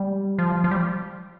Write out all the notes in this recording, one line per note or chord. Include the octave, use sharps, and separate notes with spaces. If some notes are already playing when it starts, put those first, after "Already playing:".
Already playing: G3
F3
F3
G3